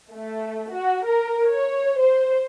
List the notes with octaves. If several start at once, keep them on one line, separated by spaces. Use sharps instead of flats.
A3
F#4
A#4
C#5
C5